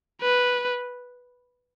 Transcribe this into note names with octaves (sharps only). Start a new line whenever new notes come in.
B4